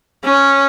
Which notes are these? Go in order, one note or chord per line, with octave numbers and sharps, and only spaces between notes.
C#4